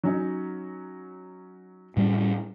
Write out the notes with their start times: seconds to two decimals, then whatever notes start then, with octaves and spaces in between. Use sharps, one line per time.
0.04 F#3 C#4 D#4
1.97 A2 G3 C#4